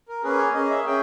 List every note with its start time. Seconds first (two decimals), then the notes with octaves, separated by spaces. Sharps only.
0.08 A#4
0.23 A#3 C#4 G#4 B4
0.38 C#5
0.54 A#3 C#4 G#4 D#5
0.71 E5
0.86 C#4 G#4 G5